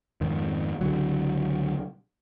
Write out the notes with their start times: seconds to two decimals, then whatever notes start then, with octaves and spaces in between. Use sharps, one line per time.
0.21 F2 G#2 D#3
0.81 C#2 D3 F#3